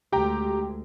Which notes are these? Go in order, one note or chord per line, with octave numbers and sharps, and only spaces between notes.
D2 G#3 G4 G5 A#5